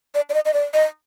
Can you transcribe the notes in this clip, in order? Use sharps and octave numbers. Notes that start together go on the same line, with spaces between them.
D5
D5
D#5
D#5
D5
D#5